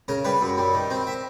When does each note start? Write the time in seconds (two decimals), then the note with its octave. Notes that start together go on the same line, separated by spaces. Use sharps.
0.08 C#3 A#4
0.25 G3 B4
0.41 F#2
0.58 G3
0.74 D#3
0.90 C4
1.07 E5